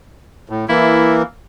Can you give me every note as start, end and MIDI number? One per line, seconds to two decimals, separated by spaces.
0.50 0.65 45
0.69 1.22 52
0.69 1.22 58
0.69 1.17 64